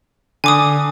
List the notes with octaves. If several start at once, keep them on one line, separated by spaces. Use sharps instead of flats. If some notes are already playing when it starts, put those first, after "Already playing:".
D3 G#5 D6 D#6